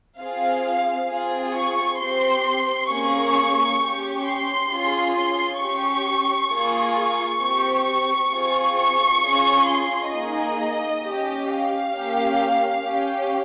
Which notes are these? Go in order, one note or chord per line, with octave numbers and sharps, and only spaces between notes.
C4 F4 G#4 F5
C4 F4 G#4
C#6
C4 G4 C6
A#3 C#4 G#4 C#6
C#4 G4
C6
C#4 F4 G#4
C6
C#4 G4 C#6
A#3 F4 G#4
C#6
C4 G4
C#6
C4 F4 G#4
C#6
C#4 F4 G#4
C6
A#3 D#4 G#4 D#5
C#4 G4
F5
A#3 C#4 G4
C#4 G4